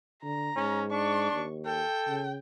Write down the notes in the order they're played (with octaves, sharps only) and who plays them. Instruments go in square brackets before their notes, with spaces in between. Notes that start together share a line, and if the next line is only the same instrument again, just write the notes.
[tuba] D3 [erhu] A#5
[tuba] G#2 [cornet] C#4
[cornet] D4 [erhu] C#6
[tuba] D#2
[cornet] A4 [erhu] G5
[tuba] C#3